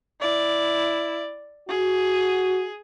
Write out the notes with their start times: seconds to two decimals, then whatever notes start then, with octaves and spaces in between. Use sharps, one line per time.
0.20 E4 D5
1.69 F#4 G#4